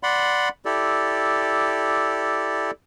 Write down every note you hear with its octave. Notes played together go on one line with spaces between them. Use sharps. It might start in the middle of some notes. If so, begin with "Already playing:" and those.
D5 F#5 B5 C6
E4 G4 A4 D5